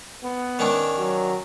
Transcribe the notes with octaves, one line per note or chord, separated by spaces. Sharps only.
B3
D#3 C#4 D4
F#3